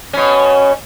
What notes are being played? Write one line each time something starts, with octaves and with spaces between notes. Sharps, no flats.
B2 C#4